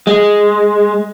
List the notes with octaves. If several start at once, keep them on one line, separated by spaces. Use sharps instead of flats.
G#3